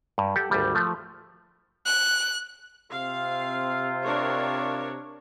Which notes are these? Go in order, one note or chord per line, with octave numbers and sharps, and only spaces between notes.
G2
G4 A4 F#5
G#1 D2 G3
F3 A3
F#6
C3 C4 F4 F5
D4 A#4 C#5